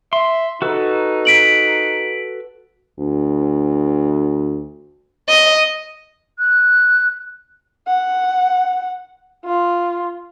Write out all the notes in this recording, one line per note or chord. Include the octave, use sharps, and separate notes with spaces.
E5 C6
D#4 F#4 A4 B4
B6 D7 F#7
D2
D#5
F#6
F#5
F4